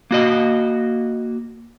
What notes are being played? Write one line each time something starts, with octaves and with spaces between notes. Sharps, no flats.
A#3 F#4 D#5